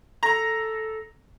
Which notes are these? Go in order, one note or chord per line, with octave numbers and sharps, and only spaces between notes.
A4 A#5